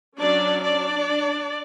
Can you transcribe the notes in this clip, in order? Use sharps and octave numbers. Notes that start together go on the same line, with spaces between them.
F#3 C#4 D4 D5
D4 D5